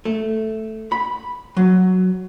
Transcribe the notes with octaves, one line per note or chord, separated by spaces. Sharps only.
A3
B5
F#3